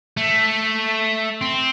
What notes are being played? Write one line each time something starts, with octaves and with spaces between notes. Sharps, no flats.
A3
C4